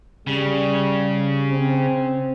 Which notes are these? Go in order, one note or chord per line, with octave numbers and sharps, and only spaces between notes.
C#3 G3
C4